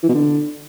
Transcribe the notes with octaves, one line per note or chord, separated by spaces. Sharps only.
E3
B2
D3